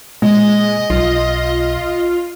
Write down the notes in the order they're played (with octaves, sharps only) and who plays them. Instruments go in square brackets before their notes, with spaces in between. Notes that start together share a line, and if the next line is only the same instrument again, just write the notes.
[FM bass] A#2 [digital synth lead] G#3 [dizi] D#5
[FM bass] B1 [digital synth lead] F4